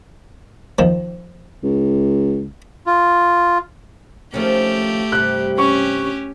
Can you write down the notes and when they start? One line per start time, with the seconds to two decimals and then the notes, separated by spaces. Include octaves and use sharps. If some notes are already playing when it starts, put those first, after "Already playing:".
0.79 D#3 F3
1.63 C#2
2.86 F4
4.34 D#3 F3 A3 C#4 G4
5.12 G2 C3 F#6
5.58 C#4 G4 C#6